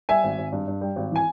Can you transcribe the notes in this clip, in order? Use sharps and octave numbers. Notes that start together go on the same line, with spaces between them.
G3 E5 G#5
G#1
G#1
G2
G2
G3
G#1
E3 G#5